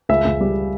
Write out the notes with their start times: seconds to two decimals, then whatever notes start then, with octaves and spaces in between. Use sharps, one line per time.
0.09 C#2 E5
0.25 C#2
0.41 G3